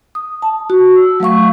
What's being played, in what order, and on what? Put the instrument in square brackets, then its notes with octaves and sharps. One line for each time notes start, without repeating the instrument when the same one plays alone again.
[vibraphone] D#6
A5
F#4
E6
F#3 A3 F5 C#6